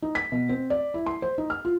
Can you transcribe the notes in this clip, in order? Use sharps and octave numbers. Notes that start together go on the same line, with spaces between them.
D#4
B6
B2
C4
D5
E4
C6
C5
D#4
F6
F4